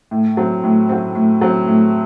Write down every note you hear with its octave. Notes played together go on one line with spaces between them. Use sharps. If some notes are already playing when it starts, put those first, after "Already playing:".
A2
F#3 C4
A2
F#3 C4
A2
F#3 C4
A2